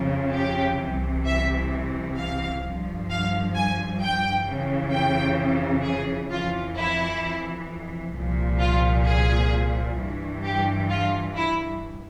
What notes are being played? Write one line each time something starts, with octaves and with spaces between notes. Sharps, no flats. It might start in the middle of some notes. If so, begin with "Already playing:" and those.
Already playing: F2 C#3 F3
G4
C2 C3 E3
E5
F5
G2 F3
F5
G#5
G5
F2 C#3 E3
G5
G#4
F2 E3 F4
E4
C2 A#2 F3
F4
G#4
G2 E3
G4
F4
E4